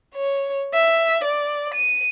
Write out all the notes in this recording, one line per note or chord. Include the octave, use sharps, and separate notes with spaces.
C#5
E5
D5
D#7